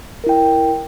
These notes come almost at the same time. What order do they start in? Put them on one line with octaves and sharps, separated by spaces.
A#4 E4 G5